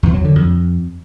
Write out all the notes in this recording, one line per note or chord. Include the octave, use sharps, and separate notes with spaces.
E2
F#3
D3
F2